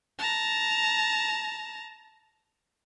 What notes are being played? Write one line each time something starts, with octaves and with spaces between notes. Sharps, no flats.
A5 A#5